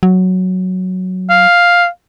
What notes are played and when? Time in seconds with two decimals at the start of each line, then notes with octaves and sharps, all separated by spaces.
0.03 F#3
1.30 F5